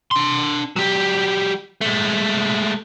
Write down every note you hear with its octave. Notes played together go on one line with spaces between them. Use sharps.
D4 C6
F#3 G4
G#3 A3